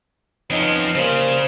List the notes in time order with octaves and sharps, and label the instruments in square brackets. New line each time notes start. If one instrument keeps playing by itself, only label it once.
[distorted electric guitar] F2 F3 [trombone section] B3 C#4 D#4
[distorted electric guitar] C#3 [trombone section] G3 A#3 C5